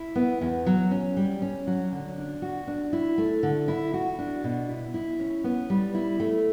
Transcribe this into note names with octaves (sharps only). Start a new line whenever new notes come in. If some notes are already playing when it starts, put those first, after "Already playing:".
Already playing: E4
B3
E2
F#3
C#4
G3
C#4
F#3
D3
D4
F#4
D4
E4
A3
D3
E4
F#4
D4
B2
E4
E4
C#4
B3
G3
E4
A3